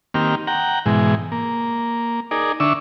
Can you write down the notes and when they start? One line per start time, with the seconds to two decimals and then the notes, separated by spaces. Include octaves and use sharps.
0.14 D#3 A#3 C4 G4 F6
0.47 F#5 G5 A#5
0.86 G#2 B2 E3 G#3
1.32 A#3
2.31 D#4 G#4 A#4 D5
2.60 D3 D4 E5 C#6 E6